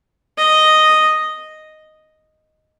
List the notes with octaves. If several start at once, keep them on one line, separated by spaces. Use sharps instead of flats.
D#5